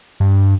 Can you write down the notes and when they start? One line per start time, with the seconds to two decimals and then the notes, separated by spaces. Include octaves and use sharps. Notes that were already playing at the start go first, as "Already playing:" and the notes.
0.20 G2